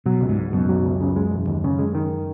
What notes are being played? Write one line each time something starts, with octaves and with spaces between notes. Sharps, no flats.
B2 F#3
C#2
G#2
C#2
F#2 B2
F#3
C#2
C#3
G#3
E1
D#2
C#3
G#3
D#3